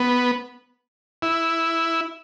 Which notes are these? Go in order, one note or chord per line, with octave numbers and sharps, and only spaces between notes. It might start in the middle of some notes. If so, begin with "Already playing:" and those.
Already playing: B3
E4